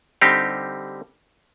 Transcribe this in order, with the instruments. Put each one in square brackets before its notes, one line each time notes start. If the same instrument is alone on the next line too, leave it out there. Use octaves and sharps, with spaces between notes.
[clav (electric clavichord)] D3 G3 C4 D#4 G4